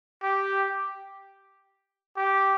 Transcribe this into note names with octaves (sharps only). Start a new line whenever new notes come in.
G4
G4